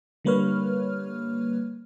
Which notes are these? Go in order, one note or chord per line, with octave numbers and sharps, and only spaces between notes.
D3 G3 A#3 B4 C#5 F6